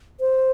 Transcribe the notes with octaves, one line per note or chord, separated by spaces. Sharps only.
C5